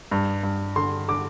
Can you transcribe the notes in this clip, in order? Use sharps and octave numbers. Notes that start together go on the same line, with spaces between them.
G2
G2
D3 C6
D3 D6